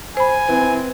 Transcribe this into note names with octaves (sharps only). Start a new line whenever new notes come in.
C5 G#5 B5
E3 C4